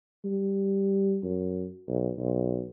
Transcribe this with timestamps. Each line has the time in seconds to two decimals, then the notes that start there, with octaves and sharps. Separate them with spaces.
0.25 G3
1.23 F#2
1.88 B1
2.18 B1